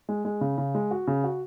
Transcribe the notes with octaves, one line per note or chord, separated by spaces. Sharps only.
G#3
G#3
C#3
C#3
G#3
F#4
C#3
F#4